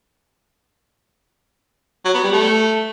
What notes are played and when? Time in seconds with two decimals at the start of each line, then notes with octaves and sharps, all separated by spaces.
2.05 F#3
2.14 B3
2.23 G3
2.33 A3